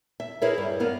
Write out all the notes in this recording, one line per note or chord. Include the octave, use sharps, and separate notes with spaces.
E5
E4 G#4 A#4 B4 C#5 E5
G2
B3 E4 A#4 F5